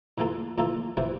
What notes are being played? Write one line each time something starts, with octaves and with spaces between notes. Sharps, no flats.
A2 E3 A#3 F4 A4
A2 E3 A#3 F4 A4
C3 E3 A3 C4